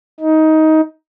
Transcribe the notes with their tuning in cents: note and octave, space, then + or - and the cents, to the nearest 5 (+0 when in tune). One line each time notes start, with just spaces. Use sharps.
D#4 +15